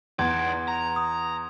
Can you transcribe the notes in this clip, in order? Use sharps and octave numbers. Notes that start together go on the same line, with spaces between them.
E2 D#4 D5 C6 G#6
A#5
D#6